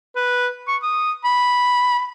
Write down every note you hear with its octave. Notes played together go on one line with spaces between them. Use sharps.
B4
C#6
D#6
B5